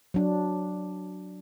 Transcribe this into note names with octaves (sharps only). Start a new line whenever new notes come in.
F#3 D4